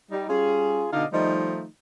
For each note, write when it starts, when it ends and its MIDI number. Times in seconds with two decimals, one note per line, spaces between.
0.12 0.26 55
0.12 0.26 63
0.29 0.88 55
0.29 0.88 61
0.29 0.88 65
0.29 0.88 68
0.93 1.05 47
0.93 1.05 50
0.93 1.05 63
0.93 1.05 74
0.93 1.05 75
0.93 1.05 77
1.12 1.66 51
1.12 1.66 53
1.12 1.66 55
1.12 1.66 57
1.12 1.66 63